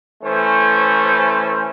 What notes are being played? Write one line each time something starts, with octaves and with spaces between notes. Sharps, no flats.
E3 A3 C#4 C5